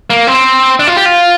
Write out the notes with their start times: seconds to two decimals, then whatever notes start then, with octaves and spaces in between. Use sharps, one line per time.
0.10 A#3
0.27 C4
0.80 D4
0.87 F4
0.97 G4
1.06 F4